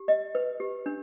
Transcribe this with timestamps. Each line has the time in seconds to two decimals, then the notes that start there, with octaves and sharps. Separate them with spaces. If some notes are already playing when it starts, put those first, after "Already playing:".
Already playing: G4
0.08 D#5
0.35 B4
0.60 G4
0.86 D4